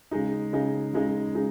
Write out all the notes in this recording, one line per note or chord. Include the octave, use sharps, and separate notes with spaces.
C#3 G#3 D#4
C#3 G#3 D#4
C#3 G#3 D#4
C#3 G#3 D#4